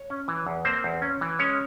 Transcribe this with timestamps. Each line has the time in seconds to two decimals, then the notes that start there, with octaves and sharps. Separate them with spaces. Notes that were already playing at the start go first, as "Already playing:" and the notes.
Already playing: C#5
0.10 C#4
0.28 E3
0.47 E2
0.65 A#3 C4 C5
0.84 E2
1.02 C#4
1.21 E3
1.39 G#3 C#4 C#5